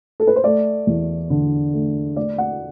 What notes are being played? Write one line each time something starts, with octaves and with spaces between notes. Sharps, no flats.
A4
B4
C5
A3 D5
E2
D3
A3
A3 D5
F#5